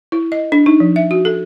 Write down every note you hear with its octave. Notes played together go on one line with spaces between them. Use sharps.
E4
D#5
D4
D#4
F3
E5
F#4
A4